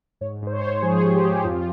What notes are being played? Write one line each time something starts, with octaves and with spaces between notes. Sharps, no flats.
G#2 C#5
G#2 C5
C#5
G#2
F3 G#4
F3 G4
F3 G4
F2 F4